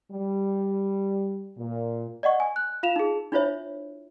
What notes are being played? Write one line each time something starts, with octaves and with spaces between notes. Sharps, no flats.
G3
A#2
D5 D#5 F#5 C#6
G#5
F#6
F4 F5 E7 F7
D#4 G#4
D4 E4 F4 C5 C#5 E5